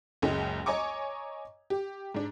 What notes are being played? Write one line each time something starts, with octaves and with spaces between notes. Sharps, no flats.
F#1 C#2 G#3 C#4
C#5 D#5 G#5 A#5 C#6 D6
G4
G#2 D4